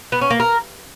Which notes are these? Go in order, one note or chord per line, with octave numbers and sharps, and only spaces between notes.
B3
C#4
A#3
A#4